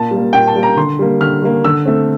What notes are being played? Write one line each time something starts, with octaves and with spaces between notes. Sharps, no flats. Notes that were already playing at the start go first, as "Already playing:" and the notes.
Already playing: A#2 A5
G3
A#3
A#2 G5
A5
G3 A#3
A#5
D3 C6
G3 A#3
D3 F6
G3 A#3
D3 E6
A3 C4